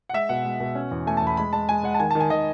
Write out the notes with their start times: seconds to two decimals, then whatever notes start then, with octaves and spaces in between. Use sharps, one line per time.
0.09 F#5
0.13 G#3 E5
0.29 B2 F#5
0.45 G#3
0.60 B2
0.75 C#4
0.91 E2
1.07 A3 G#5
1.17 E2 A5
1.27 B5
1.37 G#3 B5
1.53 G#3 A5
1.69 G#3 G#5
1.84 G#3 F#5
1.95 A5
2.00 D#3 G#5
2.11 D#3 A5
2.20 G#5
2.30 D#3 D#5